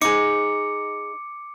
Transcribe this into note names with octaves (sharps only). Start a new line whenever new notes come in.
D#4 G#4 D6 C#7